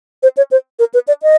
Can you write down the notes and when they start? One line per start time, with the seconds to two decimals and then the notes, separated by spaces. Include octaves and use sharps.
0.23 C5
0.37 C#5
0.51 C5
0.79 A#4
0.94 B4
1.08 D5
1.23 D#5